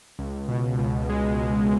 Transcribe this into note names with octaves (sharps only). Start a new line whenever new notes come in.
C#2
B2
C#2
G#3
C#2